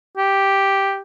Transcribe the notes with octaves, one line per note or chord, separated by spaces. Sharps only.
G4